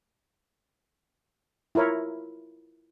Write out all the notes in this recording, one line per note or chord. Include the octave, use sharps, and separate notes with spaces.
E4 F4 A#4 C#5